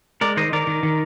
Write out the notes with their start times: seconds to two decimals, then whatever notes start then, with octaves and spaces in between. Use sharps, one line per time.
0.21 G#3 A#4 D5
0.37 D#3 C5 D#5
0.53 D#3 A#4 D5
0.67 D#3
0.83 D#3